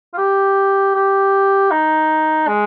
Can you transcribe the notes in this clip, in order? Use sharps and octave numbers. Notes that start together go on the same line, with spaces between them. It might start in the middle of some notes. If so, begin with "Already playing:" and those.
F4
G4
G4
D#4
G#3